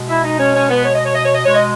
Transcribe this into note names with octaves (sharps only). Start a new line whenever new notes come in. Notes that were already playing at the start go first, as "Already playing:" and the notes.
Already playing: B2 G#3
E4 E5
D#4 D#5
C#4 C#5
C#4 C#5
B3 B4
C#5
D#5
C#5
D#5
C#5
D#5
B2 G#3 C#5
D#5